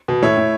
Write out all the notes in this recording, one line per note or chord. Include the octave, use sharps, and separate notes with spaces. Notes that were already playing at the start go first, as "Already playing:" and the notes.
B2
A2 C#5 E5
A2